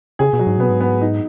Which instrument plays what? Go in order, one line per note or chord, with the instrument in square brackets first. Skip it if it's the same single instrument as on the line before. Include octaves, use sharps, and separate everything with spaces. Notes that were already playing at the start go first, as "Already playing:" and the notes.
[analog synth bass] C#3 [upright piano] G#4
[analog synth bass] B2
[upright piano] F#3
[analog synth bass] G#2
[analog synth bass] B2 [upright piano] B3
[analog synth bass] G#2
[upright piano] B3
D#4